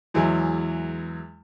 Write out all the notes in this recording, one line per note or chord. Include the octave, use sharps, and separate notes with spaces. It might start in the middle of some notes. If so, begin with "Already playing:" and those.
E2 E3 F#3 G#3